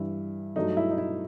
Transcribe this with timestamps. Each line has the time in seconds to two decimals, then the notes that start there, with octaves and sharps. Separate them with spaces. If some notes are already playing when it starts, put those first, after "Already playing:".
Already playing: G2 E3 G3 E4
0.56 G2 F#3 A3 D#4
0.77 E4
0.91 D#4
0.98 E4